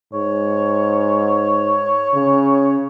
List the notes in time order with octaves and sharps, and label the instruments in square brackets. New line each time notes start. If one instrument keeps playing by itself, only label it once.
[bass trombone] G#2 [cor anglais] C#5
[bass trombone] C#3